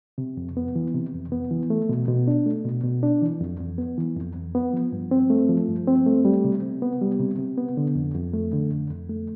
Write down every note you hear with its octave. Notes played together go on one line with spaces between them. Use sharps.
C3
F2
B3
E3
C3
F2
B3
E3
A3
B2
B2
D4
A3
B2
B2
D4
E3
F2
F2
B3
E3
F2
F2
B3
F3
G2
C4
A3
F3
G2
C4
A3
G3
C3
C3
B3
G3
C3
C3
B3
D3
F2
F2
A3
D3
F2
F2
A3